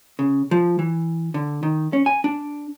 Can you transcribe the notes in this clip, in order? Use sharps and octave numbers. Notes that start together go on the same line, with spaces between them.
C#3
F3
E3
D3
D#3
C#4
G#5
D4